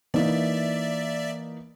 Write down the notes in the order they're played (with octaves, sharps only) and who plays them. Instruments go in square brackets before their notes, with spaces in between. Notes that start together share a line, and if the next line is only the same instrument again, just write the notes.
[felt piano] E3 A#3 D#4 [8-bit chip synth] D5 E5